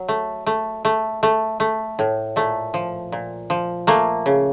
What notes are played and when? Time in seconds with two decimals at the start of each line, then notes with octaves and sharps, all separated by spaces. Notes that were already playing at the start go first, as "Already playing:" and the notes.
Already playing: F#3
0.08 A3
0.46 A3
0.85 A3
1.23 A3
1.60 A3
1.99 A2
2.36 A#2 A3
2.74 F3
3.12 A#2
3.50 F3
3.87 A3 A#3
4.26 C#3